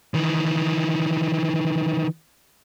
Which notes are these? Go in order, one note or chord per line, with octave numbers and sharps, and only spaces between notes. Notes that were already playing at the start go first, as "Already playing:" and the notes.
D#3 E3